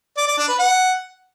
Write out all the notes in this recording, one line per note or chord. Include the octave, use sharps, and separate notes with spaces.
D5
D5
D4
B4
F#5